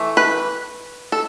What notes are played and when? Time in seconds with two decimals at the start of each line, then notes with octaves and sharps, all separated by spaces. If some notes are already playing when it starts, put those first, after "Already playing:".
Already playing: E3 A3
0.17 B4
1.12 A4